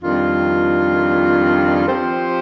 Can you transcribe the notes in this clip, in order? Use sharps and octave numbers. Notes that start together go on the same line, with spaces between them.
F2 D#3 G3 D4 F4
F3 C4 G4 C5